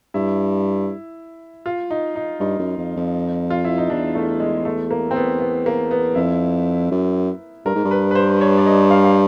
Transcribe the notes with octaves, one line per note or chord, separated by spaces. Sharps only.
G2 E4
F4
D#4
D#4
G2 D#4
F#2
F2
F2
F4
E4
D#4
E2 D4
A3
G#3
A3
A#3
C4
B3
B3
A#3
B3
F2 E4
F#2
G2 A#4
G#2
G2
B4
B4
C5
C#5
D5
D#5
F5
F5